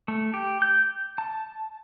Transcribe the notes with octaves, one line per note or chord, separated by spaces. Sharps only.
A3
G4
G6
A5